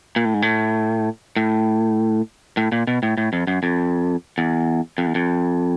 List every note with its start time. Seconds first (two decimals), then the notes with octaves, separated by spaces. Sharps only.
0.16 A#2
0.25 A2
0.34 G#2
0.42 A2
1.36 A2
2.57 A2
2.72 A#2
2.87 B2
3.03 A2
3.17 A2
3.33 F2
3.47 F#2
3.63 F2
4.38 E2
4.98 F2
5.06 E2
5.15 F2